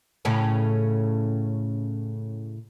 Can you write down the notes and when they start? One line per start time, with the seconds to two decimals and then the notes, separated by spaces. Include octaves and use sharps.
0.25 A2 C#3 C#4